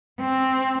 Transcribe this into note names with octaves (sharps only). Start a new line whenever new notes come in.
C4